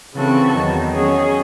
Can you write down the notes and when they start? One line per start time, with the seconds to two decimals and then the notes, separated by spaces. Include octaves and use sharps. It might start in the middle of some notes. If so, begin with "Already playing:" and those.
0.14 C#3 E3 C4 F#4 A4
0.54 E2 D#3 F#3
0.93 D#3 F#3 C#4 G#4